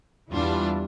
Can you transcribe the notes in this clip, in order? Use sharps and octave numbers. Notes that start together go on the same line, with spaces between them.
E2 E3 G3 D4 F4